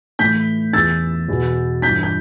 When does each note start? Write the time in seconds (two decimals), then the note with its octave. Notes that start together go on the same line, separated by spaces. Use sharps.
0.19 A2 E3 G6 B6
0.73 E2 E3 E6 A6
1.29 E2 B2
1.82 G2 E3 G6 B6
2.03 G6